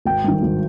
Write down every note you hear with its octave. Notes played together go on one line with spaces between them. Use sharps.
G#1 G5
G2 D#3
G#1